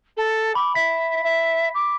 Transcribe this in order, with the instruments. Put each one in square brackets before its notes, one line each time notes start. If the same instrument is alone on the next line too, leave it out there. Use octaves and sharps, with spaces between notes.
[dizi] A4
[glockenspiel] B5 [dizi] D6
[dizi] E5 [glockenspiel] B6
[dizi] E5
D6